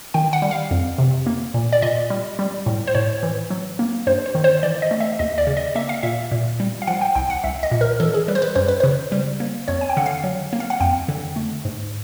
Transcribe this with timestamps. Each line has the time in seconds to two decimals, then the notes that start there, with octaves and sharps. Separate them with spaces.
0.14 D#3 G5
0.33 F#5
0.42 G3
0.51 F5
0.71 F2
0.98 C3
1.27 A#3
1.54 A#2
1.73 D5
1.82 A#2 D#5
2.10 G3
2.39 G3
2.66 A2
2.87 C5
2.95 A2 C#5
3.23 E3
3.50 F#3
3.79 A#3
4.07 G2 C5
4.26 C5
4.35 D#3
4.44 C5
4.63 E3 D5
4.82 D#5
4.91 A3
5.00 E5
5.19 D#2 D#5
5.38 D5
5.47 C#3
5.57 D#5
5.75 A#3 E5
5.89 F5
6.03 A#2 E5
6.32 A#2
6.60 G3
6.82 F5
6.87 F3 F#5
7.01 G5
7.15 C2 G5
7.30 F#5
7.44 C2 E5
7.63 D#5
7.71 A#2
7.81 A#4
8.00 E3 A4
8.14 G#4
8.28 G3 B4
8.35 C5
8.42 B4
8.55 F#2 C5
8.68 B4
8.80 C#3 C5
9.12 G3
9.40 A#3
9.68 F2 C#5
9.81 G#5
9.89 G5
9.97 D3 F#5
10.06 F5
10.24 F#3
10.53 A#3
10.60 F5
10.70 F#5
10.80 F2 G5
11.08 D3
11.36 A3
11.65 G#2